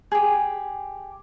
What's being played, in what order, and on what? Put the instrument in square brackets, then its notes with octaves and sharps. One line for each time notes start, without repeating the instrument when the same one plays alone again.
[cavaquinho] G4 G#4